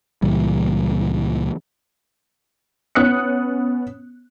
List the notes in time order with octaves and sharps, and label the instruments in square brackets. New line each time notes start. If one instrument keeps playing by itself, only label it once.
[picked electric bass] C#2 A#2 E3 G3
[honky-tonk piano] B3 C#4 D#6 F#6 C#7